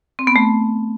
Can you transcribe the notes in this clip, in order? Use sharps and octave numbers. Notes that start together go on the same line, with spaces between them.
C4
B3
A3